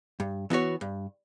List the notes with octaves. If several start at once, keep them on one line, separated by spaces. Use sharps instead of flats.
G2
E3 B3 F#4 C#5
G2